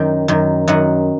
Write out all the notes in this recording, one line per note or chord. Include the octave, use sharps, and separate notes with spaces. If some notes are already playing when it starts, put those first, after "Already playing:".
Already playing: F#2 D#3 G5
F#2 D#3
F#2 D#3 F#5